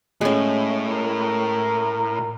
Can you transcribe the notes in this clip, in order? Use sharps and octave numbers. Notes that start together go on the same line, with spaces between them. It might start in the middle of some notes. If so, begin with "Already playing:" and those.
A2 G#3 C#4
A#4